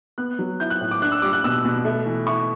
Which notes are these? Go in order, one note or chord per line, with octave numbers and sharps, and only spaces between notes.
B3 F#6
F#3
E4 G6
F#6
A2
D6
D4 F#6
E6
G3 D6
F#6
B2 E6
B2
A3
E3
E4 C#6